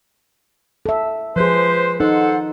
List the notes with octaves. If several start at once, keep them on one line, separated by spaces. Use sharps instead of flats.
A4 E5
F3 G#4 B4 C5
D#4 A4 C5 F#5